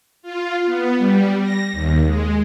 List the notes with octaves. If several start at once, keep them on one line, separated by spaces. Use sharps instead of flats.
F4
B3
G3
A#6
D#2
G#3